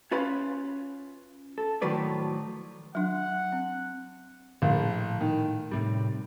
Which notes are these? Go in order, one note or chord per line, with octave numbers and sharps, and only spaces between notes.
C#4 F4 B4 C#5 F5 B5
A4
A2 D#3 F3 F#3 B4 D5
F#3 D4 F#5
C4
A#1 A2
D#3
A2 C3 G3